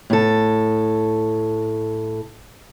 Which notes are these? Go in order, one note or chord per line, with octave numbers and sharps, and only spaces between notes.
A2 A4